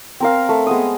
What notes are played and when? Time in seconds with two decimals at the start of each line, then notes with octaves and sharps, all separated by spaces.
0.20 C4 A#4 F5
0.49 A3
0.67 G#3 B3 D#6